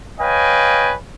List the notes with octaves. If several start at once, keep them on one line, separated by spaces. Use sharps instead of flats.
B4 C#5 D#5 F5 G5 G#5